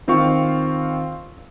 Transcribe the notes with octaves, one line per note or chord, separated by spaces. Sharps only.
D#3 C4 F4 F5 C#6